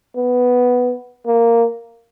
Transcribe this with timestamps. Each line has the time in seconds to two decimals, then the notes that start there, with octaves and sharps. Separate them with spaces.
0.16 B3
1.27 A#3